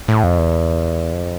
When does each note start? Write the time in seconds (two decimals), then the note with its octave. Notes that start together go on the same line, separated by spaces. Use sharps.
0.08 A2
0.23 F2
0.38 E2
1.13 F2